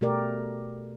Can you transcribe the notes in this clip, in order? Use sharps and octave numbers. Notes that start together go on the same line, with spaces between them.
B2 A3 G4 A#4 D5